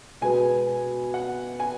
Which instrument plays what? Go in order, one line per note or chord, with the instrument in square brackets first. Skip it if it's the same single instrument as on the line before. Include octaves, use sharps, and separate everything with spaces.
[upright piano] B2 G#3 B3 G#5
F#5
G#5